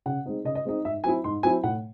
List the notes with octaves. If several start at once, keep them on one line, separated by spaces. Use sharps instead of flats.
C#3 F#5
G#3 C4 D#4
C#3 D#5
D#5
G#3 C4 D#4
G#2 E5
F#3 C4 E4 G#5
G#2 C6
F#3 C4 E4 G#5
A2 F#5